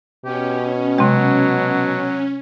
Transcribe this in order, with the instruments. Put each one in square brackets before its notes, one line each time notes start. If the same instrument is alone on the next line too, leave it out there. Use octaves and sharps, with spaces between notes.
[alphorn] B2 [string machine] C#4 [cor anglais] G4
[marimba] C3 G#3 [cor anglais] F#3